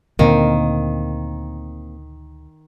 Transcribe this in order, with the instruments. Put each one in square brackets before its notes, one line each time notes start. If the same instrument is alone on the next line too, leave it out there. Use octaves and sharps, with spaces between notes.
[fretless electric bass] D2 A#2 D3 [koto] D#3 [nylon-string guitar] A#3 C4